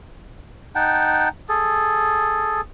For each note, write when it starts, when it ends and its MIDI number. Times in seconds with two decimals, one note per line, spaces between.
0.75 1.29 63
0.75 1.29 78
0.75 1.29 79
0.75 1.29 81
1.49 2.61 68
1.49 2.61 69